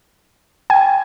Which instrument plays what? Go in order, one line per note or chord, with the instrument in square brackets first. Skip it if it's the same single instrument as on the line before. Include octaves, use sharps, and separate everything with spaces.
[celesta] G5 [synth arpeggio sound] G#5